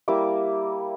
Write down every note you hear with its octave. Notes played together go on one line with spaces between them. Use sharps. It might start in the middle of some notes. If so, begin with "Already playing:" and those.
G3 A#3 E4 D6